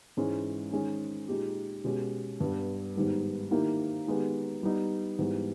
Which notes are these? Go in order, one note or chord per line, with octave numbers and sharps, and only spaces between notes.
G#2 E3 G#3 C#4
D#3 G#3 C#4 G#4
A#2 G#3 D#4 G4
B2 G#3 C#4 G4
G2 G3 B3
G#2 D#3 G3 B3
D#3 A#3 E4 G4
D#3 G#3 B3 G4
G3 B3 D#4
G#2 E3 G3 B3